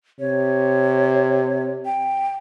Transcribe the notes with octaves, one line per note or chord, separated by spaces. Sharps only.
C3 C#5
G5